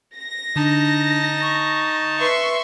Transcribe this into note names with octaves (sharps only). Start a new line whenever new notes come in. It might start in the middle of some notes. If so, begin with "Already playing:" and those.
A#6
D3 D4 D#4 A5
C#6
B4 E5 C6 C#6